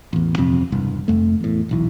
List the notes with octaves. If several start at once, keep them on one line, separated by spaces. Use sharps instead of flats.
A1 E2
D#1 F2 C3 C4
E1 C2 G2
F1 F2 A3
E2 A2
D#1 B1 E3